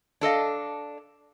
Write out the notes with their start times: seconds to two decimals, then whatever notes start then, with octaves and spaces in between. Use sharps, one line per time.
0.21 D4 A4 D#5 F5